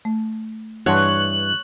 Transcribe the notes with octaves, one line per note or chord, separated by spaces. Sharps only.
A3
G2 E3 C#5 F#5 A5 C6 F#6